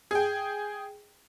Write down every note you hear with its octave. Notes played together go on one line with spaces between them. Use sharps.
G#4 G5